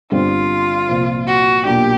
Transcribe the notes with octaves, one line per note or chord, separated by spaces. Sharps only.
G1 G2 D3 G3 C4 F4
C2 A#2 F3
F#4
B1 A#2 F#3 A#3 D4 G4